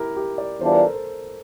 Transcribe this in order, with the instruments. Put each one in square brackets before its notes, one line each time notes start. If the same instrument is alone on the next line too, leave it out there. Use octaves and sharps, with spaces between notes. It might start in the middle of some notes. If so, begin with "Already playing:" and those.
Already playing: [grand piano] E4 G4 A#4
G4
D5
[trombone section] E2 E3 G3 D4 F4 [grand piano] C5
[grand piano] A#4
A4
A#4